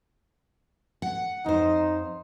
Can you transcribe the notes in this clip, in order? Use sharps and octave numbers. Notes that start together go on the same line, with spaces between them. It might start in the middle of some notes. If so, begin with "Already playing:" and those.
F#5
F2 D#4 C5